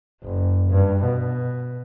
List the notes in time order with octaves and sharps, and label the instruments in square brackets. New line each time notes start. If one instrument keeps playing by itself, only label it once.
[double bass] F#1
G2
B2